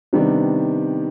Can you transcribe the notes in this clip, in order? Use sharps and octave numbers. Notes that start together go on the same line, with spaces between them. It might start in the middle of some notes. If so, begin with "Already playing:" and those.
C3 D#3 G3 B3 D4